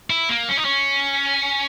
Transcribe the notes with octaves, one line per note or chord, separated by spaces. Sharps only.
E4
A#3
C#4
D#4
C#4